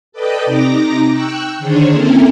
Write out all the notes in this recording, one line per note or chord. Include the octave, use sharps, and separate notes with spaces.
A4 B4 D5 D#5 G5 D#6
C3 D#4 A#5 D6 A#6
G5 C#6 E6 F#6
D3 D#3 D4 G#4 C5 C#5
A#3 C4 C#4 E4 A4 A#4